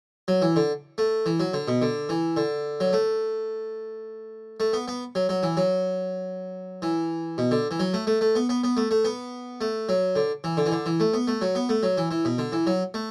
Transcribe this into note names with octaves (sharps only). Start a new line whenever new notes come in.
F#3
E3
D3
A3
E3
F#3
D3
B2
D3
E3
D3
F#3
A3
A3
B3
B3
F#3
F#3
E3
F#3
E3
B2
D3
E3
F#3
A3
A3
A3
B3
B3
B3
A3
A3
B3
A3
F#3
D3
E3
D3
E3
D3
E3
A3
B3
A3
F#3
B3
A3
F#3
E3
E3
B2
D3
E3
F#3
A3